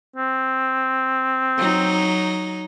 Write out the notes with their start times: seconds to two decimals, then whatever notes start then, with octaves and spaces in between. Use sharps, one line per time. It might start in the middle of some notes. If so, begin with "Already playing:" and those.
0.16 C4
1.57 F#3 D#4